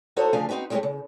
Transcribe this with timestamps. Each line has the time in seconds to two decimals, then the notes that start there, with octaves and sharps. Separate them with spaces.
0.16 D#4 F#4 A4 C5 C#5
0.33 D2 C#3 F3 D4 F5 G#5
0.49 C4 D4 D#4 F#4 B4
0.70 G3 G#3 C4 G4 G#4 C#5
0.83 C#3